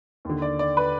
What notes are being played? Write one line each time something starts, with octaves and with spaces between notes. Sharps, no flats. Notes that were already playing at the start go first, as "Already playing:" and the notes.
D#2 D3
D5
D5
B4